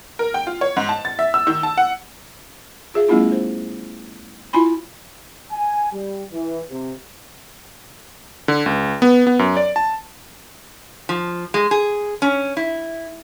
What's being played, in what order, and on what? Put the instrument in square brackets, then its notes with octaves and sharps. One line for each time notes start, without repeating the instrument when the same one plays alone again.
[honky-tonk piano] A#4
G5
F4
C#5
G#2
A5
A6
E5
E6
D#3
A5
F#5
[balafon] F4 G#4 E5 F5
G3 A3 B3 C#4 E4 F4
C5
E4 F4 G#5 B5 C6
[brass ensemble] G#5
G3
E3
C3
[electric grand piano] D3
C#2
B3
B3
F#2
D5
A5
[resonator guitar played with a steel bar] F3
G#3
G#4
C#4
E4